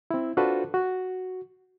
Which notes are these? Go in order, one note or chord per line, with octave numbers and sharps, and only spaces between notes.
C4 E4
D4 F4 F#4 A4 B4 C5
F#4